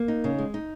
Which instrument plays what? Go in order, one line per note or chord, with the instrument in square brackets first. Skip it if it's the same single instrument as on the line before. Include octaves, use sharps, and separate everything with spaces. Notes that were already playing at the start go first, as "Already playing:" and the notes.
Already playing: [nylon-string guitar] A#3
D#4
C#3
G#3
D#4